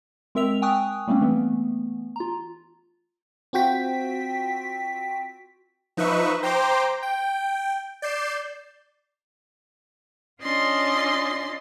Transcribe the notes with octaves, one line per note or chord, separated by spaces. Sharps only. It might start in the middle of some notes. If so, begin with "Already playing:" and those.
G#3 C4 A#4 E5 E6 F7
G5 G#5 C#6 D#6 F#6
G3 A3 A#3 C4 C#4
E3 A3 B3
F4 A#5
C4 F4 F#4 G5 B6
F3 D#4 B4 E5 C#6
C5 G5 A#5 C6 D6
G5
D5 G6 C7 E7
C#4 D4 F4 D#5 C6 A6